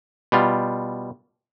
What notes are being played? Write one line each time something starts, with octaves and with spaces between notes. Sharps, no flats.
B2 G3 F4